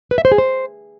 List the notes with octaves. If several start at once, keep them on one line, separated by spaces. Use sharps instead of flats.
B4
E5
C5
G#4
C5